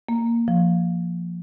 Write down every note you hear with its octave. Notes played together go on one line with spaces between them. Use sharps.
A#3
F3